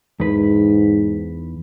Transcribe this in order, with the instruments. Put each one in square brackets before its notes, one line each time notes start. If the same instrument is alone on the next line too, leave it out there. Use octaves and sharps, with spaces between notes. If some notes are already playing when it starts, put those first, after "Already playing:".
[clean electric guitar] E2 B4 [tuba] G#2